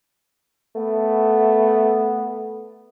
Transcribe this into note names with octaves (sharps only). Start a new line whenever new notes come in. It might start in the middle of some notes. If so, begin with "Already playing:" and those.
A3 B3